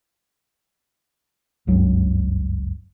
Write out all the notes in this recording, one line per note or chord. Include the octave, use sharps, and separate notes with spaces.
F#1 C#2 G2 F#3